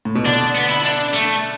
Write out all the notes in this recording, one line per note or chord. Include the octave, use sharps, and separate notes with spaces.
A2
B2
D3 D4
B3
E4
D4
A3